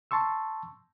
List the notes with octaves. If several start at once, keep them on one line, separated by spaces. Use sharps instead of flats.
A5 C6 C#6 E6